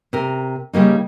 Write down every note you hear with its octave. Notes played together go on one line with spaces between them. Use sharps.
C3 A#4
C#3 G3 A#3 D#4